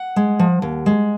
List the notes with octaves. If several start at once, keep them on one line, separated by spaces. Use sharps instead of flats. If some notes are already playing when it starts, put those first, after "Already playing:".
Already playing: F#5
G#3
F3
D#2
G#3